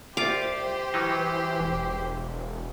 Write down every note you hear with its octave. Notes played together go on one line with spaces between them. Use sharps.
C2 F4 G4 C5 F5 D6
E3 F#3 G3 D#4
E1